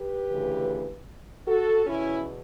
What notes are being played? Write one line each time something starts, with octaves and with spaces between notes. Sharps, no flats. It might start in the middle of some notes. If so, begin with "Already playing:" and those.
Already playing: G4 B4
D2 C#3 E3
F#4 A4
E2 B2 C#4 E4